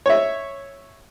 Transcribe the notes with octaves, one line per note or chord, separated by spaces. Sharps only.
C#5 E5